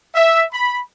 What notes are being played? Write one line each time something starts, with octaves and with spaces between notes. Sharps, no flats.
E5
B5